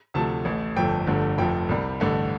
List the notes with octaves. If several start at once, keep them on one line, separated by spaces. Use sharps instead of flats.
D2 C3 F3 A3 A5
A1 A2 A3
G1 F2 F3 A3 G5
G1 G2 D3 F3 A3
F1 F2 F3 A3 G5
C2 C3 G3
A1 G2 D3 A3